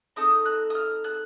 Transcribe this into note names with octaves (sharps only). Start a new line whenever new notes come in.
C4 D#4 A4 D#6
F#6
D#6
F6
F#6